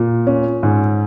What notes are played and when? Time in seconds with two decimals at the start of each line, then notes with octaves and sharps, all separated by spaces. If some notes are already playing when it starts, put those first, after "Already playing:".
Already playing: A#2
0.27 C#4
0.63 G#2